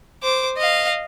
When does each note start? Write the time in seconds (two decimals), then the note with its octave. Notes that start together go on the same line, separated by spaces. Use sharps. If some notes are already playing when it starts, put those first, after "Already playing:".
0.23 C5 D6
0.58 D#5 F5